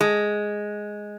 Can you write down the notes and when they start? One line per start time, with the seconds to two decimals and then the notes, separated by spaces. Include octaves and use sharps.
0.01 G#3